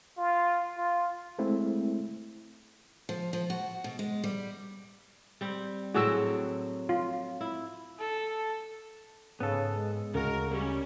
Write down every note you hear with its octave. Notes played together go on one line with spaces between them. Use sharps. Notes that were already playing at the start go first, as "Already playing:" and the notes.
F4
F4
G#3 A3 C4 E4
F3
F3
F#4
B2
G#3
G3
G3 C4
A2 F#3 C4 F#4 G#4 E6
F4
E4
A4
G#2 C#3 B3 A4
G#3
D2 C#3 F#4 A#4
G3 C#4